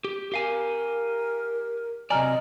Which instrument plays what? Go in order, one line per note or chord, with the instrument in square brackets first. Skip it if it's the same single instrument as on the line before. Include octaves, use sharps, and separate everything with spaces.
[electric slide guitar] G4
[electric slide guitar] G4 F5 G#5 [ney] A#4
[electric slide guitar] C3 F#3 D5 [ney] D#5 [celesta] G#5 A#5 F6